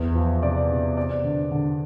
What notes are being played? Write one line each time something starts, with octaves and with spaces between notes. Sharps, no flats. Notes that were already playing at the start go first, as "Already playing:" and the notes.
Already playing: E2
F3
C3 D5
C3
C4 D5
D3
D3